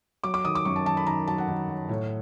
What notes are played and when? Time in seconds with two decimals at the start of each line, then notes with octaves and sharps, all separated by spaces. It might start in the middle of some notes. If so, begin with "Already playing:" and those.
0.24 F#3 D6
0.34 D6
0.45 D#3 D#6
0.55 D6
0.65 F#2 C#6
0.76 A5
0.86 D#3 A5
0.97 B5
1.07 D#3 A#5
1.27 F#3 A5
1.38 F#5
1.48 D#3
1.69 F#3
1.89 A2